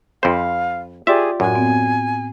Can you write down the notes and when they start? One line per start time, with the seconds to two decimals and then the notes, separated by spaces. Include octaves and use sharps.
0.23 F2 C5 F5 B5
1.07 F4 G4 G#4 D5 E5
1.40 F#2 A2 F#4 G#5
1.55 B3 C4